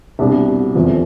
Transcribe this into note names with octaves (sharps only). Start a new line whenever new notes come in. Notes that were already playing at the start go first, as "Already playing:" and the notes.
C2 B2 G3 D4
F1 E2 C3 F3